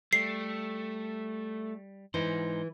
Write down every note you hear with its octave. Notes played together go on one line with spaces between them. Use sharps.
G3 A3 C7
G#2 E3 D#4 C5